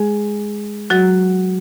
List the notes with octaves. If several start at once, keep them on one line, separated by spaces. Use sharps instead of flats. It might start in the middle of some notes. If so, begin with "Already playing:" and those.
Already playing: G#3 G#4
F#3 F#4